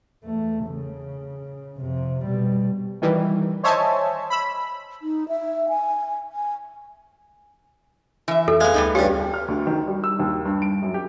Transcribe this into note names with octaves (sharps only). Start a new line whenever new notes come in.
E2 A3
C#3
F2 C3
B2 G3
D#3 E3 G3
C5 C#5 D#5 E5 G#5 A5
B5 E6
D#4
E5
G#5
G#5
E3 E5
F2 A4
G#3 B3 F5
D2 G3 B3 D#4
G2 C#3 G4
G5
F6
D2
D#3
G3
E6
D#2
G2
D7
F#2
G4